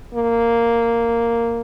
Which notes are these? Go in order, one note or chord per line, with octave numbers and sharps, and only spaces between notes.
A#3